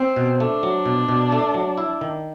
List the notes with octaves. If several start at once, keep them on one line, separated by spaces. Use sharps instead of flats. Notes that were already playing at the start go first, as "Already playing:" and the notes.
Already playing: C4
B2
A3 D4
F#3
B2
B2
A3
F#3
E4
D#3